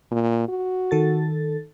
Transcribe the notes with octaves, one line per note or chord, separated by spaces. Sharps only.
A#2
F#4
D#3 A4 A6